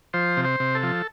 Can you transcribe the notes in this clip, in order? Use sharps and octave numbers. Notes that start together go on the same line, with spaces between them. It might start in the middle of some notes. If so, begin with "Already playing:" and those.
F3 C5
C3
C5
C3
A4
F3